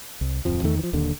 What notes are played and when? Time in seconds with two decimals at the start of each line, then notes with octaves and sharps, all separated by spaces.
0.21 C2
0.45 D1 F2 F3
0.64 E2 D#3 A3
0.79 E3 F3
0.93 D#1 D#2 D3